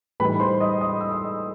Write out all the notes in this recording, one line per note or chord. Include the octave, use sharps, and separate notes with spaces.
A2 E3 G3 D#4 B4 B5
C5 C6
D#5 D#6
D#5 D#6
E6
D#5 D#6